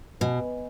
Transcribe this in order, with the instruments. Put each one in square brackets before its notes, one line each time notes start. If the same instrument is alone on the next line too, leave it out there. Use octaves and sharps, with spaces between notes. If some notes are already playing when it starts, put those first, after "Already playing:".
[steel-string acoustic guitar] B2 [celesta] B4 D#5 G#5